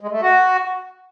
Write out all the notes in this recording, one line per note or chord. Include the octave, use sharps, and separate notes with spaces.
G#3
A3
F#4